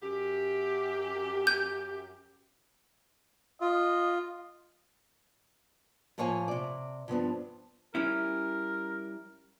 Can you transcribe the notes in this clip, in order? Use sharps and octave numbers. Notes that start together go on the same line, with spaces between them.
F#2 G4
G6
F4 D#5
A2 F3 A#3 C#5 F5 G#5
C3 D5
G2 F3 B3 D4
G3 C#4 E4 A#4